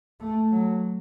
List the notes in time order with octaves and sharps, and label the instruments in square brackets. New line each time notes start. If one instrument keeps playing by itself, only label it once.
[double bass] A3
F#3